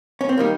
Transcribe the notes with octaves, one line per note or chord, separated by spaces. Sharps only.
C#4
C4
D#3 G3 A#3